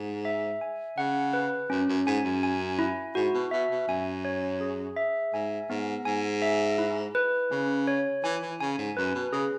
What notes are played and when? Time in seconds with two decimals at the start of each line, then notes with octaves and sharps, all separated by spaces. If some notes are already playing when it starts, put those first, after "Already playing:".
Already playing: G#2
0.25 E5
0.61 G#5
0.98 C#3 F#5
1.33 B4
1.70 F#2 C#4
1.89 F#2
2.07 G#2 G#5
2.25 F#2
2.43 G#5
2.79 E4
3.15 G#2 F#4
3.34 B2
3.51 B2 E5
3.71 B2
3.88 F#2 G#5
4.25 C#5
4.61 G#4
4.97 E5
5.34 G#2 G#5
5.70 G#2 B3
6.05 G#2 G#5
6.42 E5
6.78 E4
7.15 B4
7.51 C#3 C#4
7.88 C#5
8.24 E3 G#5
8.42 E3
8.60 C#3 G#5
8.78 G#2
8.97 F#2 B4
9.15 B2
9.33 C#3 G#4